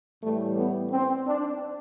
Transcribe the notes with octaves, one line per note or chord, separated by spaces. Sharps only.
A2 E3 G3 A3
B3
C4
D4